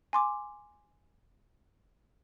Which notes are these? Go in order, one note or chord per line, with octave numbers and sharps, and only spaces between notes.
G#5 C6 D6